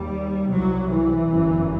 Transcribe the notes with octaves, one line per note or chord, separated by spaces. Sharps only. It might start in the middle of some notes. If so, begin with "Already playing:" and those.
Already playing: D#2 G3
C2 C3 F#3
E3
G1 F#2